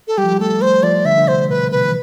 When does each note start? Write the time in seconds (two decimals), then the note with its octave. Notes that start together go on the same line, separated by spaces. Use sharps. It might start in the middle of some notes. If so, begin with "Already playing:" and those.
0.08 A4
0.18 G3 G4
0.24 F3
0.32 G3
0.40 A3 A4
0.61 A3 C5
0.83 F3 D5
1.05 D3 E5
1.18 D3
1.28 C3 C5
1.49 B2 B4
1.71 C3 B4
1.85 E3